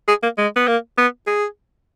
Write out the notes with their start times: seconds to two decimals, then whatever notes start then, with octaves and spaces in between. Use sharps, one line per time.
0.08 G#4
0.23 A#3
0.38 G#3
0.56 B3
0.68 A#3
0.98 B3
1.27 G#4